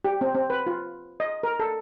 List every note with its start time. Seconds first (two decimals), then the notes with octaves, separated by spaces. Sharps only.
0.05 G4
0.21 C4
0.35 C4
0.50 B4
0.67 F4
1.20 D#5
1.43 A#4
1.60 A4